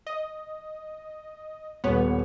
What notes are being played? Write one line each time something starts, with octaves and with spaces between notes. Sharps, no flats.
D#5
D#1 B3 C#5